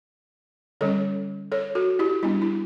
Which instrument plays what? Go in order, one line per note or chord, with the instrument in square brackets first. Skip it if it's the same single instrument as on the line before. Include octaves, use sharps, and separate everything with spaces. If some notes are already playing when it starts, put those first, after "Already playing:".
[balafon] D3 G3 C#4 A4 C#5
A4 C#5
F#4 A4
E4 G4
G3 B3 D4 E4
E4